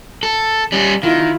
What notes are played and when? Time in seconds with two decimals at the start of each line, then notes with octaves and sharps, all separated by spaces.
0.23 A4
0.72 G3 C#4
1.03 D#3 E4 F4